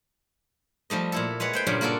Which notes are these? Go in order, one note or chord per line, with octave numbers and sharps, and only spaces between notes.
F3 G3 A3 D#5
A#2 E4 A4
G#3 B4 C#5 F#5
B4 C5 G5
G2 A#2 C#3 F#3
A#3 F4 F#4 A4 D5